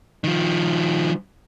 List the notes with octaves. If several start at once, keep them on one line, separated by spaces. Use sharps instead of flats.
D#3 F3